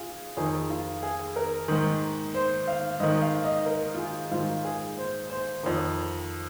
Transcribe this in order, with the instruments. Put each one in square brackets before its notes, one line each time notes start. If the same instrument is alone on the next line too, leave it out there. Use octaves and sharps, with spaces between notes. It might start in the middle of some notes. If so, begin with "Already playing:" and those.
Already playing: [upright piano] F4 G#4
F2 D#3 G#4
F4
G#4
A#4
G#2 D#3
C5
F5
G#2 D#3 D#5
F5
D#5
A#4
F4
G#4
G#2 D#3 F4
G#4
C5
C5
F2 D#3